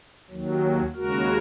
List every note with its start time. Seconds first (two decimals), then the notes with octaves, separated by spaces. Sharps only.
0.30 D#2 D#3 F#3
0.94 D#2 C#3 G#3 F#4 A#4